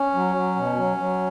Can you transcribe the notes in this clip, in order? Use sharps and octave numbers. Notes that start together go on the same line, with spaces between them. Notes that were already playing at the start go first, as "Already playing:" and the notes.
Already playing: C#4
F#3
F#3
B2
F#3
F#3